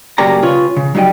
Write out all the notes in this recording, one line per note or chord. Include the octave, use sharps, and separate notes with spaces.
F#2 C#3 A#3 G4 D5 A#5
C#3 F4 B4 C#5
C#3
F#3 G3 D#4 D#5 G5